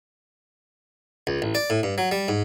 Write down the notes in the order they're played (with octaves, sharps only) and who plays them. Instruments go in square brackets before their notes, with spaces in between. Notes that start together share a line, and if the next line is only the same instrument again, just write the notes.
[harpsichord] C#2
A1
D5
A2
G2
F#3
G3
G#2